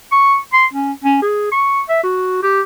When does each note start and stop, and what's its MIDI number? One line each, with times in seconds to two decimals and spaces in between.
0.12 0.37 85
0.53 0.66 84
0.73 0.92 61
1.04 1.17 61
1.22 1.50 68
1.52 1.81 85
1.89 2.01 76
2.03 2.41 66
2.43 2.61 67